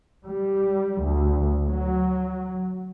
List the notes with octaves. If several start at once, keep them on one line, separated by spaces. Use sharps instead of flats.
G3
D2
F#3